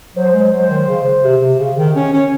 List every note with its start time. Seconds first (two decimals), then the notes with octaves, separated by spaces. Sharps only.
0.16 F#3 C5
0.33 G#3
0.51 F#3 C5
0.70 D#3
0.87 C#3
1.23 C3
1.42 C3
1.59 C#3
1.77 D#3
1.95 C#4
2.13 C#4